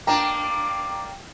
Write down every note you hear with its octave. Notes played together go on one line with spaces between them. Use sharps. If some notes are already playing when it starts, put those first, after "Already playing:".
A#3 D4 G5 A#5 D6